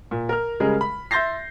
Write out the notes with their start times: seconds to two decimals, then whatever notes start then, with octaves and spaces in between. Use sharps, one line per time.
0.11 A#2
0.29 A#4 F6
0.60 C#3 G3 G#3 G#4 A#4
0.81 B5
1.11 E5 C6 G6 A6 A#6 C7